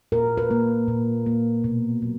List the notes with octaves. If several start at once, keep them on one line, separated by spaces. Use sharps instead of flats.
A#2 A#4
B4
A#3
A#2
A#3
B2
F#3 A#3